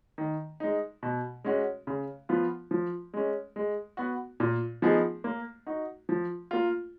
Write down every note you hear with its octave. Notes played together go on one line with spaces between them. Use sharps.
D#3
G#3 D#4
B2
G#3 C#4 F#4
C#3
F3 B3 F4
F3
G#3 C#4
G#3
B3 F#4
A#2
F3 B3 D#4 G#4
A#3
D#4 F#4
F3
A#3 F4